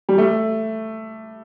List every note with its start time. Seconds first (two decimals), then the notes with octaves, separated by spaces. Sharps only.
0.09 G3
0.18 A3